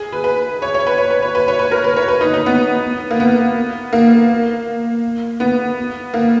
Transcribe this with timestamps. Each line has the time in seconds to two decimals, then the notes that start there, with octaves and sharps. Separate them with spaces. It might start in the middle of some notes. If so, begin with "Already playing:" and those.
Already playing: G#4
0.12 B4
0.24 B4
0.62 C#5
0.74 C#5
0.87 B4
0.98 C#5
1.10 B4
1.22 C#5
1.35 B4
1.48 C#5
1.59 B4
1.72 A#4
1.84 B4
1.96 C#5
2.08 B4
2.21 D#4
2.34 D#4
2.46 B3
3.11 A#3
3.20 B3
3.93 A#3
5.40 B3
6.14 A#3